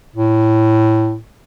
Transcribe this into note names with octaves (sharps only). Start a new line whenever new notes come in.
A2